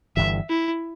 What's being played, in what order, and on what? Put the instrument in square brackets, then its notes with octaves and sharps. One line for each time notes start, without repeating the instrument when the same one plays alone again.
[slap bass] G1 G2 E3 [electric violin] E5
[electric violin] E4